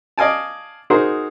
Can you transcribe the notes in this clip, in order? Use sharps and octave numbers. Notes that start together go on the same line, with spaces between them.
D5 D#5 F5 G#5 A5
D#4 F#4 G#4 A#4 C5